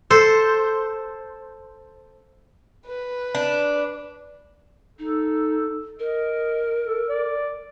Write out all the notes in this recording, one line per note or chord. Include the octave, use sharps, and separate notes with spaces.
A4 C5
B4
D4
D#4 A4
A#4 D#5
A4
D5